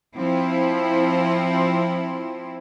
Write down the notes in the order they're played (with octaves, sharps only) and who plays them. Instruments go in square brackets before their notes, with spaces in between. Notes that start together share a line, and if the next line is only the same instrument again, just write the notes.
[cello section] F3 C4 E4